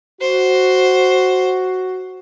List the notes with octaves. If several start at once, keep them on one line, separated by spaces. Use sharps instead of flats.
F#4 C5